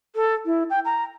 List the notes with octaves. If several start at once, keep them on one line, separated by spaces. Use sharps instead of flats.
A4
E4
G5
A#5